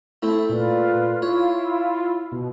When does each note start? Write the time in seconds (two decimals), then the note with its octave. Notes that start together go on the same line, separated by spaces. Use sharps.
0.23 A3 C4 E4
0.49 A#2 F4 B4 D5
1.22 E4 F4 C#5
2.32 B2